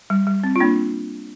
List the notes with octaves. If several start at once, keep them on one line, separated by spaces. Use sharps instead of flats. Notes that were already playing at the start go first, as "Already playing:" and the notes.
G3
G3
C4
F4
A#3 D4